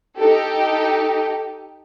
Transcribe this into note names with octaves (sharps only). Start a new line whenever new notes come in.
D#4 G4 A4